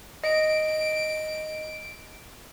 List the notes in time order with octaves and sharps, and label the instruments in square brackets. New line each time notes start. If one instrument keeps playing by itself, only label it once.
[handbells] D#5 [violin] D7